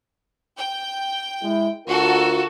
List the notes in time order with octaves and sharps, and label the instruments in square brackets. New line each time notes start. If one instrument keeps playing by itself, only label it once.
[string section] G5
[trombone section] G#3 E4
[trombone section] D2 F4 A#4 [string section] F#4 A4